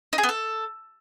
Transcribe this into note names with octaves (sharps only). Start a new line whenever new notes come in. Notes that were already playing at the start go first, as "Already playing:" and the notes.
D#4
G#4
B3
A4